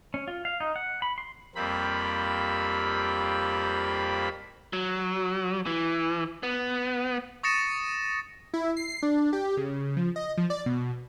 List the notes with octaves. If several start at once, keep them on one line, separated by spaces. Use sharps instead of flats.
C#4
F4
F5
D#4
F#5
B5
C6
F2 G3 A#3 C4 B5
F#3
E3
B3
C#6 D#6 A6 A#6 C#7 E7
E4
C7
D4
G4
C#3
F3
D#5
F3
D5
B2